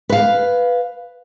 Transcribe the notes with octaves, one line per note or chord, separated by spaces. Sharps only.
B4 F5